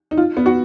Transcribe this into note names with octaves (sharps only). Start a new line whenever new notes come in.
D#4
F4
B3
F#4